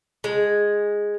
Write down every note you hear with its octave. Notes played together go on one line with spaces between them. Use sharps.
G#3